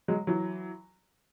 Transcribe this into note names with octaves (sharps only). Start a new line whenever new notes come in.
F#3 G#3
E3 F#3